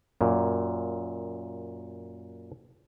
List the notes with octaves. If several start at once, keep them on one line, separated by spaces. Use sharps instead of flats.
F#2 A#2